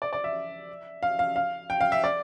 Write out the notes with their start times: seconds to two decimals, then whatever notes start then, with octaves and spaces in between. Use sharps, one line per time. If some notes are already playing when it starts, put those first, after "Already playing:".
0.02 D5
0.13 D5
0.24 E5
1.03 F5
1.19 F5
1.36 F5
1.70 G5
1.81 F5
1.92 E5
2.04 D5